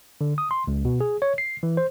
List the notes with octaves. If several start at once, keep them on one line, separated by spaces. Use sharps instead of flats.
D3
D#6
C6
C#2
B2
G#4
C#5
C7
E3
C5